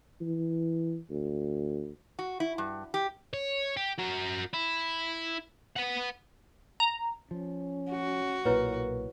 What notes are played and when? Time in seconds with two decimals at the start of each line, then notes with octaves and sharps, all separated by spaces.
0.21 E3
1.10 D2
2.19 F#4
2.40 E4
2.58 G2
2.94 G4
3.33 C#5
3.77 G4
3.98 F#4 A#4
4.53 E4
5.77 B4 F#5
6.80 A#5
7.31 F3 C#4
7.91 F#4
8.45 B1 A#2 A#3 E4 B4 C#5